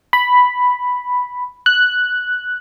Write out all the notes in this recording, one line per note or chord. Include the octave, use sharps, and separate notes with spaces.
B5
F#6